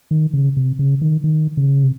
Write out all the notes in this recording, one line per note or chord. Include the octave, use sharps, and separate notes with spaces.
D#3
C#3
C3
C#3
D#3
D#3
C#3
C3